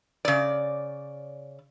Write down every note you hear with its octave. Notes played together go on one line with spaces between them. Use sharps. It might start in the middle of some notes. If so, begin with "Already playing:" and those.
C#3 D5